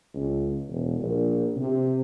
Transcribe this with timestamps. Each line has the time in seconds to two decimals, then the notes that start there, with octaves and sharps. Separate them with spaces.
0.14 C#2
0.68 E1
0.99 A#1
1.56 C3